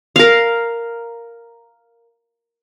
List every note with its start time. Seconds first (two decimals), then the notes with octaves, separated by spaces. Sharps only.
0.16 A#4 F5